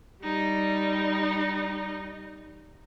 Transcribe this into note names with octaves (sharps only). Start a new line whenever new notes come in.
G3 D#4